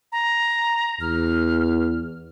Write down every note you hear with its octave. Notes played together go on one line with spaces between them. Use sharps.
A#5
E2 F6